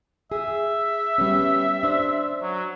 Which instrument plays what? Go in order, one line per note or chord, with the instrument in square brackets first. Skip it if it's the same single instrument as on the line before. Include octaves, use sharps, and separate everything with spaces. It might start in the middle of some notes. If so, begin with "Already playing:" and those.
[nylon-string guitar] G#4 [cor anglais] E5
[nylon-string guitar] G3 B3 C#4
D4 C5
[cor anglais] F#3